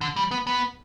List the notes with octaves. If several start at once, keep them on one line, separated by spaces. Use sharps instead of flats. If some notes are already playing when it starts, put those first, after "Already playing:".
D3
G3
B3
B3